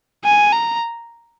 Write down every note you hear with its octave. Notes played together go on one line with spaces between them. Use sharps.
G#5
A#5